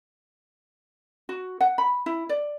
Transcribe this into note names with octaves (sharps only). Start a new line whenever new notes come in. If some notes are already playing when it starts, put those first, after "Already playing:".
F#4
F#5
B5
E4
D5